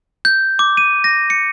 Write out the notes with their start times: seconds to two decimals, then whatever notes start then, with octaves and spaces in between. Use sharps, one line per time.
0.25 G6
0.59 D6
0.77 D#7
1.04 A#6
1.30 C#7